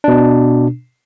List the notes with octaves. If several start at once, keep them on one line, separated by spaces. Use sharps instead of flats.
B2 D4